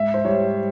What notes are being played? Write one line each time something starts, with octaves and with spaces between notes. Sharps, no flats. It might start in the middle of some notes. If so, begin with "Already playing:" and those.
Already playing: G#2 E5
C5
G3 C#5